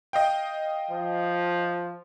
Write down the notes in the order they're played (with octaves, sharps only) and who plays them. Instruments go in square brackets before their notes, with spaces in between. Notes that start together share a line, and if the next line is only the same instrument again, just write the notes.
[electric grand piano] D#5 F5 G5
[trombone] F3